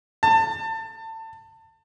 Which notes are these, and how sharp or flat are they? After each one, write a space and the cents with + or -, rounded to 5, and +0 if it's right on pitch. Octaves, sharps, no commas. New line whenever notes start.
A5 +25